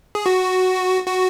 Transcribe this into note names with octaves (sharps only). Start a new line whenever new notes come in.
G#4
F#4
F#4